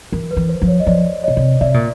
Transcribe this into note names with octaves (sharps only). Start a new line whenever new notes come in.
E3 A#4
B4
E3
C5
F3
C#5
D#5
F3 C5 D5
B2 C#5 D#5
C3
C3 D5 E5
A#2